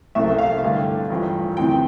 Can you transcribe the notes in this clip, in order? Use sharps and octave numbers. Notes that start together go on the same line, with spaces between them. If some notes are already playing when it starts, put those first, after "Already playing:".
C2 A#2 F3 A3 E5
F5
G2 D3 A3
A1 G2 F3
D2 C3 E3 G5